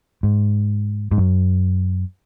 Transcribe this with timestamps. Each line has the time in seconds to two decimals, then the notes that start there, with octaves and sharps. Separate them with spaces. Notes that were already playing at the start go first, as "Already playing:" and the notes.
0.23 G#2
1.12 G#2
1.18 F#2